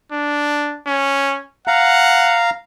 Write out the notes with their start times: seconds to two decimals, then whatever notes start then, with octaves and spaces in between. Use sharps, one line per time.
0.12 D4
0.87 C#4
1.68 F5 F#5 A#5